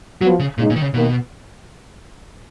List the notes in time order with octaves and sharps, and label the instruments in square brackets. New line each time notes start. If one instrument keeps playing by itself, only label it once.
[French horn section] F3 B3 F#4 [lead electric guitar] F#3
[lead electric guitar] C#3
[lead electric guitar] A#2 [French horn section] C#3 G#3 D#4
[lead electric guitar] A#2
D#3
C#3
[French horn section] D#2 D#3 A#3 [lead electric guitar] B2